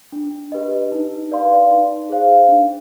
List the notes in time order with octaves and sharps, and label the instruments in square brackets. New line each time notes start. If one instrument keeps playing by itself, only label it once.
[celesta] D4
G4 B4 D#5
D#4
B4 D5 F5 C6
D#4
G#4 C5 F5
D4